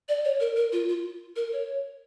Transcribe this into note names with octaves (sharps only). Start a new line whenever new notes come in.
D5
C#5
A#4
A#4
F4
F4
A#4
C#5